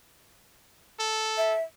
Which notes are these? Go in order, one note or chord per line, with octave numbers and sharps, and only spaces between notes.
A4
E5